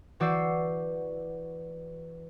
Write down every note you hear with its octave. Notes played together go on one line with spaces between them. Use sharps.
E3 F#4 D5 E6 G6 C7